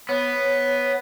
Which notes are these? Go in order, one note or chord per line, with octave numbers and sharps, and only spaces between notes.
B3 C#5